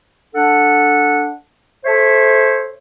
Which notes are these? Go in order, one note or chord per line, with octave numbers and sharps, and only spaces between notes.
D4 A4 F#5
A4 C5 C#5 E5